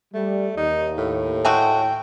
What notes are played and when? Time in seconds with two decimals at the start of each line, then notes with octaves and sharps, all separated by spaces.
0.14 G3 A3
0.57 D#2 D#4
0.97 A2
1.45 G#3 A3 F#4 G5